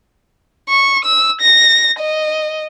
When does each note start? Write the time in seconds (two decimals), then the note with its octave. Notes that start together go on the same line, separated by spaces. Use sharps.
0.69 C#6
1.05 E6
1.41 A#6
1.99 D#5